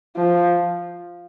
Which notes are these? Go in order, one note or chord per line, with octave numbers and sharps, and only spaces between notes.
F3